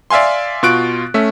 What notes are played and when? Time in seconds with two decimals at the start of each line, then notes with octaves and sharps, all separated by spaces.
0.10 D5 E5 F5 G#5 C6
0.63 B2 F4 C#6 F#6 D7
1.14 A3 C#4 E5